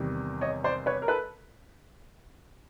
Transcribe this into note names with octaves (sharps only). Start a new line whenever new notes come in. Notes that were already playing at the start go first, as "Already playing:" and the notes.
Already playing: E2 C3 D#3 G3
C#5 D#5
C5 D5
B4 C#5
A#4
A4 B4